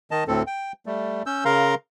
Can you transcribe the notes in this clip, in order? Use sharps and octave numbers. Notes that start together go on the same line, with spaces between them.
D#3 D#5 A5
D2 A2 C4 A4
G5
G3 A3
C#4 E6 G6
C#3 A#4 F5 A#5 C6